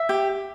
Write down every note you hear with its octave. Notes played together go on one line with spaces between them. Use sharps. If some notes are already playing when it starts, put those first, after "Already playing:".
Already playing: E5
G4